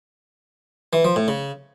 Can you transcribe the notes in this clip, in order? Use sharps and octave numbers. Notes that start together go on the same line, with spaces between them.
E3
F3
A2
C#3